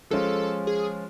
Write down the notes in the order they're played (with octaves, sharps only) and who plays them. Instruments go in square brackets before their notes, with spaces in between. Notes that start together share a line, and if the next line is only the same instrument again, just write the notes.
[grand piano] F3 G#3 C#4 F4 [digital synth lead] A4
[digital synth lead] G#4